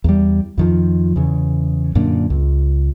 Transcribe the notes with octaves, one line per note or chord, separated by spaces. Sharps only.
E2 G3
F2 D#3 F3
E2 C#3
F#2 A#2 D3
C#2